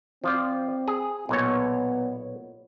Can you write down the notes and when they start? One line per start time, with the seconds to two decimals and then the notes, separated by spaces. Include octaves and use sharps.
0.24 F3 C4 F4 D5
0.88 G#4
1.29 B1 A#2 B3 C#5